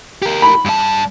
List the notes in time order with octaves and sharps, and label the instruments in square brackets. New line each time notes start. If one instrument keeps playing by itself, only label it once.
[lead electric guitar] G4 A#4
[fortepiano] B5
[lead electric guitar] G2 A5